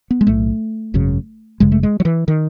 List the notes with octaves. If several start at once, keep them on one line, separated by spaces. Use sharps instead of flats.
B3
G#3
B1 A2 A3
G#1 F#2 C#3
G#1 F#2 C#3 G#3
A3
G#3
F#3
E3
D#3